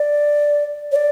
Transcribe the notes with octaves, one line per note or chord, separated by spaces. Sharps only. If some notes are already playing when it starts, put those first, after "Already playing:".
Already playing: D5
C#5
D5